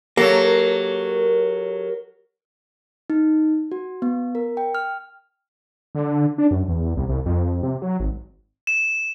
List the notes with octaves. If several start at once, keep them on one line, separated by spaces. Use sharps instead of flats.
F#3 A#3 G4 A4 A#4 C#5
D#4
F#4
B3
A#4
G5
F6
D3
D4
F#2
E2
C2
C2
F2
C3
F#3
G#1
E7